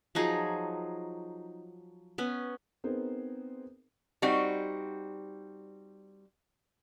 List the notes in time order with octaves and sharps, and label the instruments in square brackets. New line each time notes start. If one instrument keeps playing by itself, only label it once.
[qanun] F3 F#3 D#4 G#4
B3 C#4
[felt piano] B3 C4 D#4 G#4 A#4 C5
[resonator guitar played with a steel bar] G3 C4 D#4 F#4